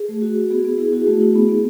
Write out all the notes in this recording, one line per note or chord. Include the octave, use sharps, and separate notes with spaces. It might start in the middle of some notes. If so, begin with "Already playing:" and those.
Already playing: G#4
A3
F#4
F#4
B3 G#4
B3
E4 G#4
E4 F#4
G#4
A3 F#4
E4 G#4
B3
B3